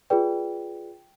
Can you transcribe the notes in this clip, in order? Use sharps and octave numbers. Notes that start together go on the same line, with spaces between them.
F4 G#4 B4 D5 G5